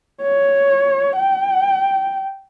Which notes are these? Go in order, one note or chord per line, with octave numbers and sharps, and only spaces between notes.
C#5
G5